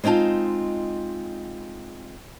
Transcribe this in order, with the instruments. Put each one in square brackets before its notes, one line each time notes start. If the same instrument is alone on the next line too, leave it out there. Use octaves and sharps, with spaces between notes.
[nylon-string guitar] G#3 C4 D#4 F4 A5